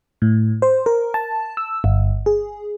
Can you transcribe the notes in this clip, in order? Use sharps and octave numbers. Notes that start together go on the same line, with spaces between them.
A2
C5
A#4
A5
E6
G1
G#4